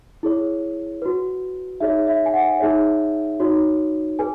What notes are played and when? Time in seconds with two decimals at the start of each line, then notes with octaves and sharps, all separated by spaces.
0.23 E4 G#4 C#5
1.02 F#4 B4
1.80 D#4 G#4 C#5 E5
2.07 E5
2.26 G#5
2.34 F#5
2.60 D#4 G#4 C#5 E5
3.40 D#4 F#4 C#5
4.19 G#4 B4 G#5